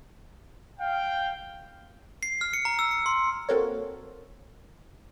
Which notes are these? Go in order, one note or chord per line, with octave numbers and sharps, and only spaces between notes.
F5 G5
C7
F6
C#7
A#5
E6
C#7
C6
A#3 C4 F#4 A4 A#4 C#5